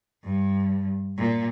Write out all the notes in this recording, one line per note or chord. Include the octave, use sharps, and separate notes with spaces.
G2
A#2